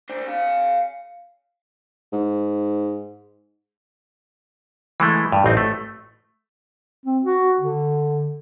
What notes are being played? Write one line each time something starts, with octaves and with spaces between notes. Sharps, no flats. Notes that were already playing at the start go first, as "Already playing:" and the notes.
D4 C5
F5 G#5
G#2
E3 G#3 A3
G2
A1 C4 D#4
A3
C4
F#4
D3